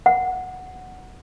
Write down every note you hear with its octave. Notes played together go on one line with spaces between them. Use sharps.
F#5